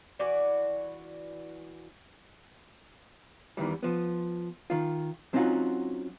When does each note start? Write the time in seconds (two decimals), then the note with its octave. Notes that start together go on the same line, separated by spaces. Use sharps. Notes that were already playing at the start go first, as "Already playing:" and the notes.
0.19 E3 F#4 D5
3.57 E2 D#3 E3 G3
3.83 F3 B3
4.70 D#3 F4
5.33 F#3 C4 C#4 D#4 F4 F#4